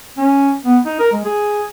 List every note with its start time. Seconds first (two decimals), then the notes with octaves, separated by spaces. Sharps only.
0.17 C#4
0.65 B3
0.85 D#4
0.99 A#4
1.12 G#3
1.25 G#4